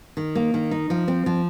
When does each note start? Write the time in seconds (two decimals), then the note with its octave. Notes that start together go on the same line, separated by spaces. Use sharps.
0.17 D#3
0.35 A#3
0.54 D#3
0.71 D#4
0.90 F3
1.08 C4
1.26 F3